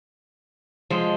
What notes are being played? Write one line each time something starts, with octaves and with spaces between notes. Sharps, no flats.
F3 G#3